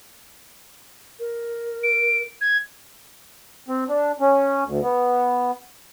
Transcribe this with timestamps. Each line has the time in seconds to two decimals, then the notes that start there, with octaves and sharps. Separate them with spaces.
1.20 A#4
1.83 D7
2.41 G#6
3.68 C4
3.89 D4
4.20 C#4
4.65 D2
4.82 B3